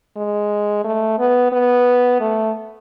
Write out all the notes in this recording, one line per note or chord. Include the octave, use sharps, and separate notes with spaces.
G#3
A3
B3
B3
A3